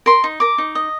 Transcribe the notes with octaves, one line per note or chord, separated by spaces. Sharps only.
A#4 C6
D#4
A#4 D6
D#4
D#5